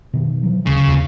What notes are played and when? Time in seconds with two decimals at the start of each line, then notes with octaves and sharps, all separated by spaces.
0.14 B2 D#3
0.43 E3 F#3
0.67 D#1 D2 C#3
0.87 D#2